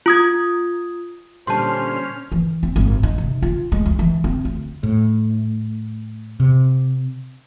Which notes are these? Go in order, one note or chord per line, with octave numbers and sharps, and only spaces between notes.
F4 D#6 G#6
A#2 D3 G3 C#4 C5 A5 C6 F6
E3
C4
G#1
D#4
C3
F4
G#3
C#2
E3
C4
D2
A2
C3